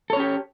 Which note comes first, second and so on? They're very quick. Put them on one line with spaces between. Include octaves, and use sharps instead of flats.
A4 C#5 C#4 G4